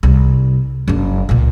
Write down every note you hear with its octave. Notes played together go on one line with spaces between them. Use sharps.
C2
F#1 D4
C#2 A#2